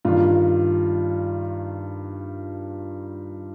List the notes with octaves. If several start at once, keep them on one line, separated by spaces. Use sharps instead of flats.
G2 D#3 F4